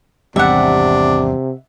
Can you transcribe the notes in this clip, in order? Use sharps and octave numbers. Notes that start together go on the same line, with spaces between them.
G#1 E2 C3 G3 D4 E5 F#5